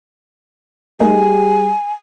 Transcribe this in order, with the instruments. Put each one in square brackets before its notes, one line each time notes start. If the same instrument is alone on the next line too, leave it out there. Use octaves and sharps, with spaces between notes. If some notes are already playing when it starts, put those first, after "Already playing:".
[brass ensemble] G3 G4 G#4 [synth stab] A3 A#3 D#4 [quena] G#5